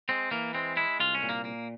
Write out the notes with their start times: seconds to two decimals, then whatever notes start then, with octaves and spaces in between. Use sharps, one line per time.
0.09 G#3 C4
0.31 E3 A#3
0.54 G#3 C4
0.77 G#3 E4
1.00 C2 F4
1.15 C#4
1.23 A#2
1.29 A#3
1.45 A#3